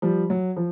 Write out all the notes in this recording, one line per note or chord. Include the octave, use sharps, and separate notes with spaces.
F3 G3
F#3
F3